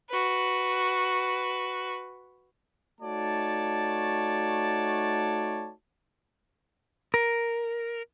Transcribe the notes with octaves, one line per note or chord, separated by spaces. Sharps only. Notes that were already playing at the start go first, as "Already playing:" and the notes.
F#4 B4
A3 D#4 F#4 C#5 D5 A5
A#4